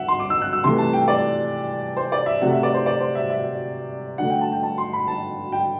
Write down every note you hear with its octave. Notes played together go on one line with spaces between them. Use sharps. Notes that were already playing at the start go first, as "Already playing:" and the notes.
Already playing: F#3 E5 F#5
C6
D6
E6
F#6
E6
C3 E3 A3 C6
A5
G5
D5
C5
D5
E5
C3 F#3 A3 F#5
E5
D5
C5
D5
C5
E5
E5
D3 F#3 A3 F#5
G5
A5
G5
A5
C6
B5
A5
G5